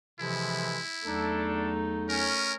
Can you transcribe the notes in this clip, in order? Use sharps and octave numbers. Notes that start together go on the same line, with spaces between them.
C3 E3 F3 G#3 E4 A4 B5
E2 F#3 A3 D4 D#4 A4
C#4 A#4